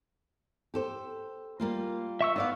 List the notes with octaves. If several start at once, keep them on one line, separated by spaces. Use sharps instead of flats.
G4 A4 C5
G3 A#3 F4
E5 C#6 E6
B3 D#4 D5 F5